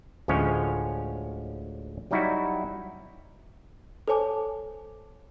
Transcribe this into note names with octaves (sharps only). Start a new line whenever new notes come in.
D2 A2 F3 G#3 C#4 C#5
F#3 G3 D#4 E4 F#4
A4 C5 C#5 G#5 A5 D6